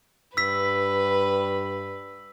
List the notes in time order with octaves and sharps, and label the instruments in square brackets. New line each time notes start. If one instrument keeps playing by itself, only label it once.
[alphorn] G2 [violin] B4 [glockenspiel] E6 B6